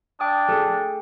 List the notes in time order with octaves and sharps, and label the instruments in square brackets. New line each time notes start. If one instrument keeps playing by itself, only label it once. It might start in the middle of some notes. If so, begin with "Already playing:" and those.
[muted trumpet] D4 [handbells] G5 D#6
[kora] A3 G#4